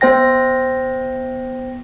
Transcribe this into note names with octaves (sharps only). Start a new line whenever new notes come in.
B3 C5 G5 A#6